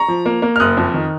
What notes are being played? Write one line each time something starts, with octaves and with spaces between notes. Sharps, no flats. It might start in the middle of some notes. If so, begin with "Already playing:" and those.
Already playing: A#5 C#6
F3
A#3
A#3
F6
F#1 D#6 F#6
F2
D#3